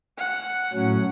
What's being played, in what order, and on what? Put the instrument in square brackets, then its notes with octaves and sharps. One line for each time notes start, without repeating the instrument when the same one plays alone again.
[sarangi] F#5
[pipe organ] A2 F#3 C#4